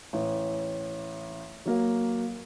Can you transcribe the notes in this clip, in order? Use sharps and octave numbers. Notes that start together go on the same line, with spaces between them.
A1
F#3 A#3